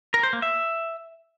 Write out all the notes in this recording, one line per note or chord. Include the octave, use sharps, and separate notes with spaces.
A#4
C5
A#3
E5